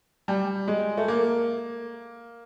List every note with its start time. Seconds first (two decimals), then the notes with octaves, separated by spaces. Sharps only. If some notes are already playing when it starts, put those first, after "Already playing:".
0.28 G3
0.68 G#3
0.97 A3
1.08 A#3